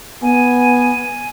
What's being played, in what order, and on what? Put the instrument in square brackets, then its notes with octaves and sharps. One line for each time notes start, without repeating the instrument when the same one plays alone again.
[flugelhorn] B3 [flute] G#5